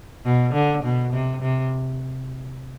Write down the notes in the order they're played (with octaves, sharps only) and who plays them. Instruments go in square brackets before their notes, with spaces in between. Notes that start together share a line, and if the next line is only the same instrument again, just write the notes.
[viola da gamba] B2
D3
B2
C3
C3